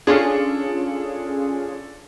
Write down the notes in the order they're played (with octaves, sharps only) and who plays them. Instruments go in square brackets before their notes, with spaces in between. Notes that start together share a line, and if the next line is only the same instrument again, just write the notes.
[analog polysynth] C#4 F4 G#4 [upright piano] D4 A4